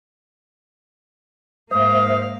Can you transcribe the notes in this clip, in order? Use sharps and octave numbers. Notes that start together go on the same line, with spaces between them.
G#2 A#3 C5 E5 F5 D#6